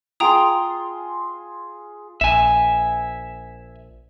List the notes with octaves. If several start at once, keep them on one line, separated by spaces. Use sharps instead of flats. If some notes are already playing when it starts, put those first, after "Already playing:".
F4 G#4 G5 A#5 C6 D#6
A#1 E5 G#5